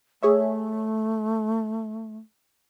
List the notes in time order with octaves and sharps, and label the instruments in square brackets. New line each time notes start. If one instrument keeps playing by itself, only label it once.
[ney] A3 [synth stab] G#4 C#5 E5